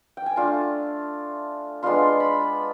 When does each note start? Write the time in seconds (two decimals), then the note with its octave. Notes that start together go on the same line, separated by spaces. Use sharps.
0.17 G5
0.26 G#5
0.36 A3 D4 F4 A5
1.83 G#3 B3 D4 F4 C6
2.20 B5